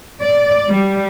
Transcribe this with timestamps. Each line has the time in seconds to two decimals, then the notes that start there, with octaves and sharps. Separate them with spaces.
0.22 D5
0.68 G3